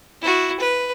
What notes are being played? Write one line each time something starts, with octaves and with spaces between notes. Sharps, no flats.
E4 F#4
B4